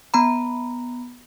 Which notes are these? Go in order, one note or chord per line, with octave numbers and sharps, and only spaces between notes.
B3 A#5 B5